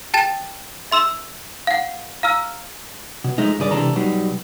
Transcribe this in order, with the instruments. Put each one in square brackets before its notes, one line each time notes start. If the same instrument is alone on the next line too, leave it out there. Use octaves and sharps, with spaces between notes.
[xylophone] G5 A5 A6 E7
E5 C6 E6 E7
F5 F#5
F5 A#5 E6 F6
[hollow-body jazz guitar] B2
F3 G#3 A3 D#4
G2 D3 G#4 D5
C#2 C3 E3 D4 A4 A#5
B2 F#3 G3 D#4